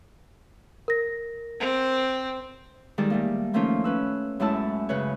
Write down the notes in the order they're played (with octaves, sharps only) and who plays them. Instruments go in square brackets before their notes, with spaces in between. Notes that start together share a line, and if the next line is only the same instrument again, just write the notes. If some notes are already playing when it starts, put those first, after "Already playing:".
[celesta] A#4 A#6
[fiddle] C4
[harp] D#3 G3 G#3 A4 D5
G3 A3 A#3
D#3 F3 A3 A#3 C#4 F4
C#4 B4 E6
F#2 G#3 A3 E4 A5 E6
C#3 B4 C#5